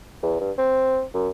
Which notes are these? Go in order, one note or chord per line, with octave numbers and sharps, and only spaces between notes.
E2
G2
C4
F#2